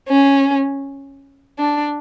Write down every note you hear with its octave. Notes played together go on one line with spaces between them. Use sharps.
C#4
D4